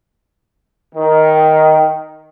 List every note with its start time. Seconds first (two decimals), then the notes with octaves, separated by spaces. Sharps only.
0.95 D#3